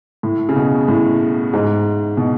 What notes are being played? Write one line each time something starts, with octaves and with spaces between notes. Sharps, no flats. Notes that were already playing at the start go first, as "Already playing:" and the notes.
A2
C#3
B2
A2
G#2
B2